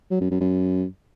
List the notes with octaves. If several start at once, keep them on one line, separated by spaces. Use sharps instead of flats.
F#3
F#2
F#2
F#2